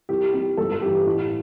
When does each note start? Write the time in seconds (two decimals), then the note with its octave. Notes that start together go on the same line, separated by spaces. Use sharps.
0.09 C2 G4
0.33 C3 G3 G4
0.57 G1 A4
0.72 A4
0.82 G2 E3 G4
1.07 A1